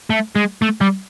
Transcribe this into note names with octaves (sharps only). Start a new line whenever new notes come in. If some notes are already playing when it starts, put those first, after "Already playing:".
A3
G#3
A3
G3